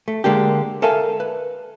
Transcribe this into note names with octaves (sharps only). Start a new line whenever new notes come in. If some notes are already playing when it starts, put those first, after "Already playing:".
A3
D3 G#3 A#3 D4 G4
A4 A#4 E5 F5 G#5 A5
B4